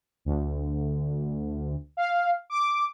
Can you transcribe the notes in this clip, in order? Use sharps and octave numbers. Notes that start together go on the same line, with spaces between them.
D2
F5
D6